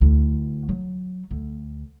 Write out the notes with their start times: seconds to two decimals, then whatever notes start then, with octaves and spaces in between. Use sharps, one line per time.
0.01 D2 E4
0.69 F#3
1.31 D2